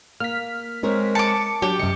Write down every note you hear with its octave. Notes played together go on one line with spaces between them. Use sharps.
A#3 F6 B6
G#3 C4 A#4 C#5
A5 D6 C#7
F#3 D4 G4 G5
F#2 C3 D#5 C#7